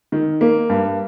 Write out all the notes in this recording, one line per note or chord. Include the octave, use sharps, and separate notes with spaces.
D#3
A#3
G2